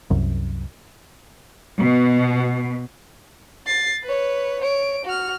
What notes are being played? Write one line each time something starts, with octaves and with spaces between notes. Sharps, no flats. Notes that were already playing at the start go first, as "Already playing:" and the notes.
C2 F#2
B2
A6 C7
B4 C#5
C#5 D7
F#4 F6